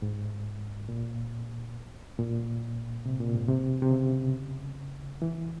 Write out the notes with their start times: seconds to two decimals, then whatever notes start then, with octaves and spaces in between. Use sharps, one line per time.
0.02 G#2
0.89 A#2
2.19 A#2
3.06 C3
3.20 A#2
3.35 G#2
3.48 C3
3.82 C3
3.91 C#3
5.22 E3